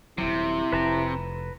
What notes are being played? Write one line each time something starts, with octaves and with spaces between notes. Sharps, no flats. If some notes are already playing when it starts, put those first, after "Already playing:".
D#1 C3 F#3 E4
F1 B4 A5 A#5